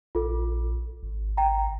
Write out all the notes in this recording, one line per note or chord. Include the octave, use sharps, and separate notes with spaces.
A#1 F4 A4
G#1
G5 A#5